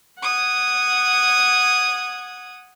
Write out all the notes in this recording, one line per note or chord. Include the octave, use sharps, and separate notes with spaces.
F#5 D#6 G#6